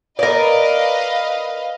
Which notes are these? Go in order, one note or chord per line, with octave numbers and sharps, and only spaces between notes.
A#4 B4 D5 D#5 F5